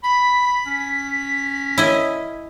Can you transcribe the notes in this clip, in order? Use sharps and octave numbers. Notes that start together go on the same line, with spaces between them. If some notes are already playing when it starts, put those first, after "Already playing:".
B5 B6
C#4
E4 D#5